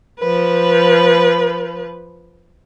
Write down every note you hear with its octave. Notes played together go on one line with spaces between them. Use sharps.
F3 B4